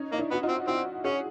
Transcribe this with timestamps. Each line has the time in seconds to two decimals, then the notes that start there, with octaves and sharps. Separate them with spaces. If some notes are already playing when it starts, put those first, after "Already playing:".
Already playing: C#4 D#4
0.12 A#3 D#4
0.18 D4 E4
0.31 B3 F#4
0.43 D#4 F4
0.49 C4
0.68 C4 E4 F#4
1.05 C#4 F#4 G#4